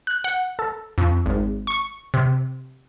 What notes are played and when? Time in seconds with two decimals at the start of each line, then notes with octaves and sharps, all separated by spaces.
0.07 F#6
0.24 F#5
0.59 A4
0.98 F2
1.26 G#1
1.67 C#6
2.14 C3